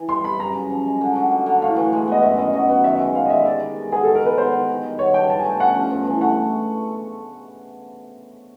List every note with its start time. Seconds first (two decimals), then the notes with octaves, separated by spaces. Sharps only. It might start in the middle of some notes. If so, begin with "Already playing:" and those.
Already playing: E3
0.08 G3 C6
0.24 C3 B5
0.39 F#2 A#5
0.55 C#3
0.70 F3
0.85 G#3
1.01 D3
1.15 F#3
1.31 A#3
1.46 D3
1.62 A2 F5
1.76 E3
1.93 G#3
2.07 B3 D#5
2.23 F#2 E5
2.38 D#3 D#5
2.53 F#3 D#5
2.69 B3
2.84 D#3 E5
2.95 E5
3.00 G#3
3.15 B3 F5
3.26 D#5
3.30 D#3 E5
3.46 C3 D5
3.60 D#3
3.76 G#3
3.91 B3 G#4
4.03 D#3 A4
4.15 A#4
4.22 G#3 B4
4.38 B3 C5
4.52 D#3
4.68 D#3
4.84 G3
4.98 B3 C#5
5.13 D4 G5
5.29 F3 A5
5.39 G#5
5.45 A3 G5
5.59 C#4 F#5
5.75 F3
5.91 G2
6.06 E3
6.21 A3 F#5